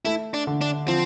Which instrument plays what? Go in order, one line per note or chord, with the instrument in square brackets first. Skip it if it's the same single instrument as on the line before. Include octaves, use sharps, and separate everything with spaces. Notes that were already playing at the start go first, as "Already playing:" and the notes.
[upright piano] A3 [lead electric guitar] E4
[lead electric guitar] D4
[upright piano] D3
[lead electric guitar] D4
[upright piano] F3 [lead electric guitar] C4